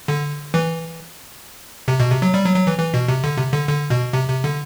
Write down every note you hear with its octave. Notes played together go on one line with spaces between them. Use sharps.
D3
E3
C3
B2
C3
F#3
G3
F#3
F#3
E3
E3
B2
C3
D3
C3
D3
D3
B2
C3
C3
D3